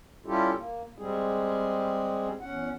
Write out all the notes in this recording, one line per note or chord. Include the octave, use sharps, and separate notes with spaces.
G3 C#4 E4 F4 G4 A4
A#3
G3 G#3 C4 G#4
E2 C#4 F#5